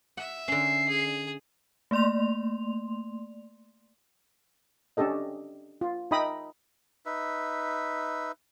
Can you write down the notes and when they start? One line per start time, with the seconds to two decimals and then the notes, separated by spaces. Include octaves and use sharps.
0.17 E5 F#5
0.48 D3 C#4 C7
0.89 G#4
1.91 A3 A#3 D5 C6 F7
4.97 C#4 D4 G4 A4 D#5
5.81 F4
6.11 D#4 D#5 E5 G5 B5 D#6
7.06 D#4 B4 E5